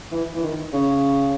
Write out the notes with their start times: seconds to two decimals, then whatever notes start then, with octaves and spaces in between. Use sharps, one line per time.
0.12 E3
0.35 E3
0.43 D#3
0.73 C#3